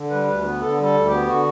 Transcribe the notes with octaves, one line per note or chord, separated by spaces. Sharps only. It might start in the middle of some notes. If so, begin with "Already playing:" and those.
Already playing: D3
G3 B4
D2 B4
B3 B4
D3 A4
G3
A4
D2
G4
B3
D3 F#4